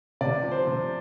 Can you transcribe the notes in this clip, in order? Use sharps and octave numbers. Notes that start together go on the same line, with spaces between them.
C3 D5
F3
C5
C3